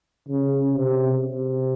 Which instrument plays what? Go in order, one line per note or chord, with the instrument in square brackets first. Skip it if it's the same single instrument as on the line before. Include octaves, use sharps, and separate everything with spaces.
[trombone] C#3
C3
C3